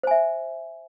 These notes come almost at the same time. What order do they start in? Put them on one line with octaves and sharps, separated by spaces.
C5 G#5 E5